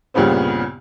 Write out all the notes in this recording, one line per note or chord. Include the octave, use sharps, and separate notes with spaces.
C2 G2 A#2 C#3 B3 C4